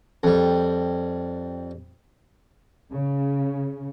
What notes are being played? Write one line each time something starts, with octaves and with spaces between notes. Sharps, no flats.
F2 G3
C#3